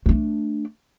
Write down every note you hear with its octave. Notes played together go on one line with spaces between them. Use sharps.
A3 D4